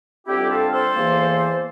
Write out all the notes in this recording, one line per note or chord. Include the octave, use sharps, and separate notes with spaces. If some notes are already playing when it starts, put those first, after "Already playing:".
F2 D3 G3 C4 E4 G4
F4 A4
A4 C5
E2 E3 A#3